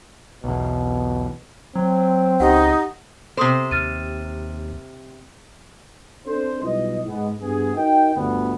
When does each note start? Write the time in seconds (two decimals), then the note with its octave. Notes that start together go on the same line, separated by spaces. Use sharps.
0.44 B1 E2 B2
1.75 F#3 C4
2.40 C#2 D#4 G4 F#5
3.37 C3 A4 C5 C6 D#6
3.71 D#2 F6 A6 D#7
6.27 C4 D4 A4 C5
6.62 B1 G3 E4 F4 B4 D#5
7.07 G#2 G#3 B3
7.40 G2 B3 G#4
7.75 D#4 F#4 A#4 D#5 G5
8.15 G1 D2 B3